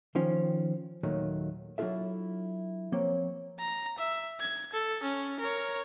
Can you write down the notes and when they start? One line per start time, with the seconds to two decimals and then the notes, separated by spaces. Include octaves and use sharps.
0.15 D#3 F3 C#4
1.03 D#2 A#2 D#3 F#3 A3 D#4
1.78 F#3 D4 E4 F4 A4 E5
2.92 F3 A#3 C4 C#5
3.59 A#5
3.98 E5
4.40 G#6
4.73 A4
5.03 C#4
5.40 A#4 C#5